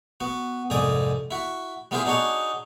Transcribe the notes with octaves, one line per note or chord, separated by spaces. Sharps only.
B3 F#4
C2 F2 G#2 D5 G#5 D#6
E4 F#4
G3 B3 E4 F4 G#4 C5
D4 D#4 F#4 G#4 C#5